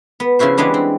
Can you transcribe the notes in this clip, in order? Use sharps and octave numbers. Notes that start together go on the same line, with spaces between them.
B3
C#3 F3 E4 F#4 C5
E3 G3 G#3 B3 D4
C4